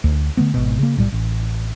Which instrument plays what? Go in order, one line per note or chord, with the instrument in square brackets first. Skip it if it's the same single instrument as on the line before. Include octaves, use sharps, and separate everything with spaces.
[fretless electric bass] D2
D3 A3 B3
G#1 B2
C#3 A#3
B1 A2 G3
A1